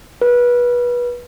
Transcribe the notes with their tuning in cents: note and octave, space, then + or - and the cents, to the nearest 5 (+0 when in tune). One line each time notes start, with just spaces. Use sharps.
B4 -25